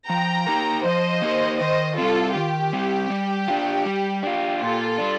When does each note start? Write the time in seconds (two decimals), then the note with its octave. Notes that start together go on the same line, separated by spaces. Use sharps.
0.09 F3 G5 A#5
0.47 A#3 D#4 G4 A#4
0.84 F3 C5 D#5
1.22 A#3 D#4 G4 A#4
1.60 D#3 C5 D#5
1.97 G3 C4 F4 A4
2.35 D#3 G4
2.73 G3 C4
3.10 G3
3.48 D4 F4
3.85 G3
4.23 D4 F4
4.61 A#2 F4 A4
4.98 G3 D4